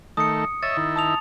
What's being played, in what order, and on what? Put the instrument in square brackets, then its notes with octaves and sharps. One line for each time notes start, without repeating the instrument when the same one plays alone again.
[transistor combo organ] D#3 A3 [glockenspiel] D#6 C#7
[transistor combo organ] C#5 D#5 E5 [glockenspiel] A6
[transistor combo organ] D#3 E4
[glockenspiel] A5 D#6 F7